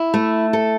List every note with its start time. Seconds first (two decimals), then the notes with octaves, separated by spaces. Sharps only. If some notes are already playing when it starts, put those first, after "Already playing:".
Already playing: E4
0.14 A3
0.53 A4